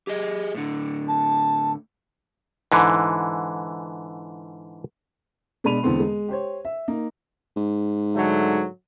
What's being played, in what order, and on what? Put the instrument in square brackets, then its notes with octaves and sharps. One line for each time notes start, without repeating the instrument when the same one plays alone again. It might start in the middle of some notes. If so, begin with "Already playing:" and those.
[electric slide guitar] G4 G#4 D#5
A2 D3
[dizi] A5
[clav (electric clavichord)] G#2 D3 E3
[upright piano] B2 G#3 D4 B5 D#7 F7
E2 D3 G#3 B3 C4 C6
G#3
G4 C5 C#5
E5
A#3 D#4
[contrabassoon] G#2
[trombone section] D3 F#3 A3